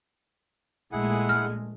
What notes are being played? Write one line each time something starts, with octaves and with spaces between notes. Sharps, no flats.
A#1 G#3 A3 E4 G#4 F#5
F6